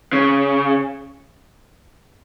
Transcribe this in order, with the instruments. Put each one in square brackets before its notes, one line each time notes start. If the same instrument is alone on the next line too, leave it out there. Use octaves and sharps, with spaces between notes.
[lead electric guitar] C#3